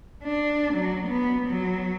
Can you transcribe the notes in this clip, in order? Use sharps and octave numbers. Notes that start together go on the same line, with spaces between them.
D4
F#3
B3
F#3